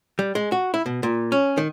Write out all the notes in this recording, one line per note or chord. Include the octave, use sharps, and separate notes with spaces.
G3
G#3
F#4
E4
B2
A#2
C#4
D#3